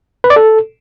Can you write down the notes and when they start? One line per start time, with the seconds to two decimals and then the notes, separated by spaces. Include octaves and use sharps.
0.24 B4
0.30 D5
0.36 A4